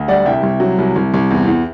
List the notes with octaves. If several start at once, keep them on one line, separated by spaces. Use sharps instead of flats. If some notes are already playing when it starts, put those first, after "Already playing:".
Already playing: D2
G3 D5 F#5
C2 E5 G5
C2
F#3
C2
C2
C2
E2
E2